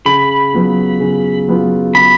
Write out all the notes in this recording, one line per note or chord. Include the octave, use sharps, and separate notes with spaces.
C#3 B5
F#3 B3 F4
C#3
F#3 B3 F4
C#3 B5